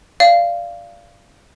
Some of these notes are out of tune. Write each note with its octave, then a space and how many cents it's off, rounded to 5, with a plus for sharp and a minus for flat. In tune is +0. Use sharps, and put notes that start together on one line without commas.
D5 +0 F5 -15